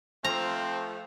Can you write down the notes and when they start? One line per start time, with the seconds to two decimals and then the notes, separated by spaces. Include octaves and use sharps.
0.24 F3 A3 C4 A#5